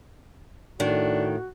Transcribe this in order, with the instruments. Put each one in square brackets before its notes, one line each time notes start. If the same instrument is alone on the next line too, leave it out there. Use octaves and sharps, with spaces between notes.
[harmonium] A2 [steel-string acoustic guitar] D#3 [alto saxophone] D4 [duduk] F#4